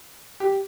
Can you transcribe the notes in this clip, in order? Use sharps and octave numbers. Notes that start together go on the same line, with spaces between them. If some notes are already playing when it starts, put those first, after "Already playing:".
G4